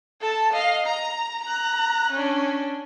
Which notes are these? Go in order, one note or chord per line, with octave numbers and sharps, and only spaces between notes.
A4 A5
D#5 F5
A#5
A#5 F#6
C#4 D4